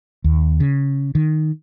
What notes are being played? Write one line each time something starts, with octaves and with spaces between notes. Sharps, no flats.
D#2
C#3
D#3